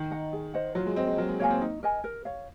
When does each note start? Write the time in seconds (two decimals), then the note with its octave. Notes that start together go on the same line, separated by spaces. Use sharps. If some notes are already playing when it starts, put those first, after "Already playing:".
Already playing: D#3
0.11 D#5 F#5 A#5
0.33 G#4
0.54 C5 D#5 F#5
0.75 F#3 F4
0.86 G#3
0.96 C4 C5 D#5
1.07 G#3
1.18 F#3 A#4
1.29 G#3
1.40 A#3 C#5 F5 G#5
1.50 C4
1.62 D#4
1.83 A#4 D#5 G#5
2.04 A#4
2.25 C#5 F5